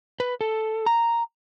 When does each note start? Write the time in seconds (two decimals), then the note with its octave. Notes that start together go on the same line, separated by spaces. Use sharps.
0.20 B4
0.41 A4
0.86 A#5